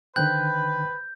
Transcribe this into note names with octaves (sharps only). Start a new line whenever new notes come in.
D3 D#3 B4 C5 G5 F#6 G6